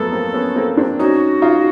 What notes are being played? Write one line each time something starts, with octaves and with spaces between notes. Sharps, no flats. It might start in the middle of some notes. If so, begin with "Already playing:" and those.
Already playing: F3 F#3 A3 B3 A4
A#3 C4
B3 C#4
A#3 C4
C4 D4
C#4 D#4 F#4
D#4 F4